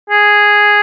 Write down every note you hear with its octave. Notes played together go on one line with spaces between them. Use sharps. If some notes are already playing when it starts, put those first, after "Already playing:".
G#4